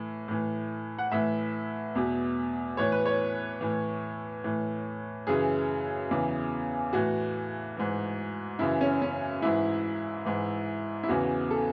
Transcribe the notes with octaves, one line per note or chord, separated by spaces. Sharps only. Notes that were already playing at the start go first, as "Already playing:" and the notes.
Already playing: A2 E3
A2 E3
F#5
A2 E3 E5
E2 B2
A2 E3 C#5
B4
C#5
A2 E3
A2 E3
F#2 C#3 E3 G#4
E2 C#3 E3
A2 E3 F#4
G#2 E3
F#2 C#3 E3 E4
C#4
C#4
G#2 E3 E4
G#2 E3
E4
E2 C#3 E3 F#4
A4